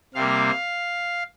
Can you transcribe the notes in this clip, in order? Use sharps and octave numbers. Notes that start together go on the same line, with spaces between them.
C3 G3 A#3 F5